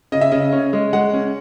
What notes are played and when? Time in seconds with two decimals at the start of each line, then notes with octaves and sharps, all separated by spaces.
0.12 C#3 D#5
0.21 E5
0.32 C#3 D#5
0.53 C#4
0.73 G#3
0.93 G#3 F#5
1.14 C#4